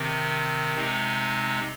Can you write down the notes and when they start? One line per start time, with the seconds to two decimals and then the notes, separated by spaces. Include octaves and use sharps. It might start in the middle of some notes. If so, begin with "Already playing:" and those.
Already playing: C3 D#3 C4
0.76 C3 G#3 C4 D#4